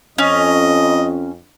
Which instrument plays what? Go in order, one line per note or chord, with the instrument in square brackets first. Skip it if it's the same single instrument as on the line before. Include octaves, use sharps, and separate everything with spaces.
[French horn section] F2 [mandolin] C#4 [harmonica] D#5